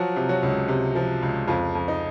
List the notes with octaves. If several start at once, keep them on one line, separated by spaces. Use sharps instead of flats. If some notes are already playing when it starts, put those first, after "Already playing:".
Already playing: F3 F#3 F#4
C3
F#3 F#4
C#2
C3
F3
C#2
F2 F4
F2
D#4